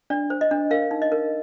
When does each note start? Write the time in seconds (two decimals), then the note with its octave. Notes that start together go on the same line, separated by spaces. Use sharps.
0.10 D4 D5
0.30 C5
0.41 D#5
0.51 D4
0.71 A#4 F5
0.91 D#4
1.02 D#5
1.12 A#4